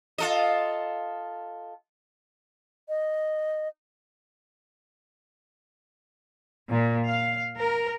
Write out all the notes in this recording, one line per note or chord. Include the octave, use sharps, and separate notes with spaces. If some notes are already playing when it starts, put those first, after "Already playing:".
F4 A4 D#5
D#5
A#2
F5
A#4